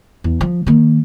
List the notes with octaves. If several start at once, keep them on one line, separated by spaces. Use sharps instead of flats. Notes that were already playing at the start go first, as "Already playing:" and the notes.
E2
F3
D#3 A#3